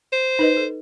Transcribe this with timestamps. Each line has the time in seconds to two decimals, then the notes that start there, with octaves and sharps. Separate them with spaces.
0.12 C5
0.39 D#4 B4 D#5
0.57 A4